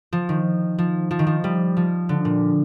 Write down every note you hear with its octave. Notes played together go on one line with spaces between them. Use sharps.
F3
D#3
F3
F3
D#3
F3
G3
F3
D3
A#2